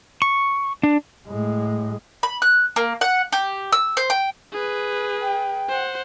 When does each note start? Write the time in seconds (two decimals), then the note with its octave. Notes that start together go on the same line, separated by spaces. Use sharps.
0.22 C#6
0.83 D4
1.27 A2 G#3
2.23 B5
2.42 F#6
2.76 A#3
3.01 F#5
3.32 G4
3.73 E6
3.97 C5
4.10 G5
4.52 G#4 B4
5.22 G5
5.69 C5 F#5